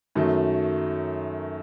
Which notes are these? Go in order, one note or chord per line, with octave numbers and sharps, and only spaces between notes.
F#2 D#3 F#3 A3